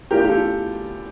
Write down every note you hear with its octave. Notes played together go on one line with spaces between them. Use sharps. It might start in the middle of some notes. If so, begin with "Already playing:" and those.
E2 E3 A3 D4 F4 G4 A#4
G4
F4 A4